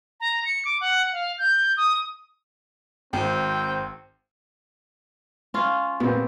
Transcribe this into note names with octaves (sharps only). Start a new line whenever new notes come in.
A#5
C#7
D6
F#5
F5
G6
D#6
G#1 C4 G5
C#4 F4
A#2 B3 C4